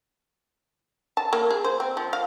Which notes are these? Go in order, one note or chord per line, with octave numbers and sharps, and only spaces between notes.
A5
A#3
G#4
C5
C4
F3
F5